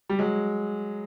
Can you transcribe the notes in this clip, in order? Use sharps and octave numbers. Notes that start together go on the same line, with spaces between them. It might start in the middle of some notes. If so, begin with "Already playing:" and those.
G3
F#3 G#3